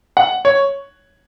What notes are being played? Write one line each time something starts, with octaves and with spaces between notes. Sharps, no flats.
F#5
C#5